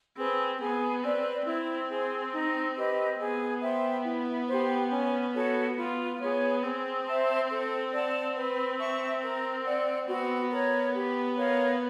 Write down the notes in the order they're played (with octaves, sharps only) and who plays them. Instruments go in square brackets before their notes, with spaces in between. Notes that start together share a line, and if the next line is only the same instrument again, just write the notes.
[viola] C4 [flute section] G#4 B4
[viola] B3 [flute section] G#4
[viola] C4 [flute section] B4 D5
[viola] C4 [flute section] E4
[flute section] G#4 C5
D#4
G4 B4 D#5
[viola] B3 [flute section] G#4
[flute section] C5 E5 G5
E4
G4 C5
C#4
F#4 A4 C#5
[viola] B3 [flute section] F4
[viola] B3 [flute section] G#4 C#5
[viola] C4 [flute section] G#4
[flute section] C5 E5 A5
A4
D5 F#5 A5
B4
E5 A5 C#6
A#4
D5 F#5
[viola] B3 [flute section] F#4
[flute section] A#4 C#5
G4
A#4 C#5 F5